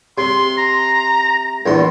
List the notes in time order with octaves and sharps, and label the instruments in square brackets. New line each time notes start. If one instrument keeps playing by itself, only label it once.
[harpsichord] C3 [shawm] C6
[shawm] A#5
[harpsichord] A#1 E2 C6